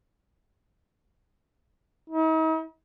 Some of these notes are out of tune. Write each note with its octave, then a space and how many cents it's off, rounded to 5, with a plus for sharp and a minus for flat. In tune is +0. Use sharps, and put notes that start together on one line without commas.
D#4 +45